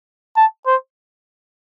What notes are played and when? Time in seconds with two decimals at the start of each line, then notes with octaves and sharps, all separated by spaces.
0.36 A5
0.67 C5